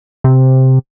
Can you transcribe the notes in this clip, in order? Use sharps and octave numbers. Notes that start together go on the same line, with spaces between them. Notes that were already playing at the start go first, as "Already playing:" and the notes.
C3